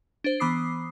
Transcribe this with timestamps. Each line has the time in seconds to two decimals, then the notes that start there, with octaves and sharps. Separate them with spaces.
0.24 D4 C5
0.40 E3 B3 B5 D6 D#6 C7